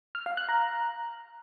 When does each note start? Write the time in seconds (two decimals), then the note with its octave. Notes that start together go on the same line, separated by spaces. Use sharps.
0.15 F6
0.26 F5
0.37 F#6
0.49 A#5